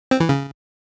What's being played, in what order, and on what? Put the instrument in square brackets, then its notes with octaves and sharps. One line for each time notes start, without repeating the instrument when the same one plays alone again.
[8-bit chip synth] C4
E3
C#3